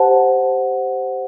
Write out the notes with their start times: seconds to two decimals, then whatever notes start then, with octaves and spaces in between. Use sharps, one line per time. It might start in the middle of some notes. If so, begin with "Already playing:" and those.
Already playing: G4 C5 F#5 A5